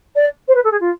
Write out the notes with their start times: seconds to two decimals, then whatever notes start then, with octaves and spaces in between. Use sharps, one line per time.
0.15 D5
0.47 C5
0.55 B4
0.64 A4
0.71 G#4
0.80 F4